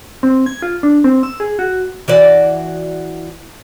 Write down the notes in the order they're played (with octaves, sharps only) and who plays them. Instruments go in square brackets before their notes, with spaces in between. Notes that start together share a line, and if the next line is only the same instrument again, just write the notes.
[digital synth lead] C4
G#6
F4
D4
C4
E6
G#4
F#4
[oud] E3 F#4 D5